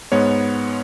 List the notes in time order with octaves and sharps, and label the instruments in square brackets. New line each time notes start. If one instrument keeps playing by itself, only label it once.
[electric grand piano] G#2 G#3 B3 C#5